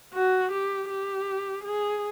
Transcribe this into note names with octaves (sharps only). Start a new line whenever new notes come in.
F#4
G4
G4
G#4